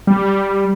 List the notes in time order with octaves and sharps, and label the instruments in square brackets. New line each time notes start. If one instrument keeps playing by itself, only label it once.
[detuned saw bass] G3